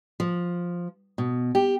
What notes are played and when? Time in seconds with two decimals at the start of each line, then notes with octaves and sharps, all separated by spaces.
0.20 F3
1.18 B2
1.55 G4